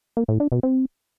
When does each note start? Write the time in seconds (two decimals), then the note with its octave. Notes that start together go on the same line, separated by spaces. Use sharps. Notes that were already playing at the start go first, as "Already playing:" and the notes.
0.17 A#3
0.28 A2
0.40 D4
0.52 B2
0.63 C4